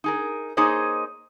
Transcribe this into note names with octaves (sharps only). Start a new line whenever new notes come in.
D#4 G#4 A#4
A#3 D#4 G#4 C5 C#5 D#5